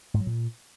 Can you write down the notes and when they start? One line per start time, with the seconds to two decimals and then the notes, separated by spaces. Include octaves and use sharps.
0.14 G#2
0.20 F#3
0.27 A#2